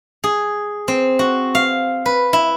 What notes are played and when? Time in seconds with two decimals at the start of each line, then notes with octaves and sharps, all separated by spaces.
0.24 G#4
0.88 C4
1.19 F#4
1.55 F5
2.06 B4
2.33 E4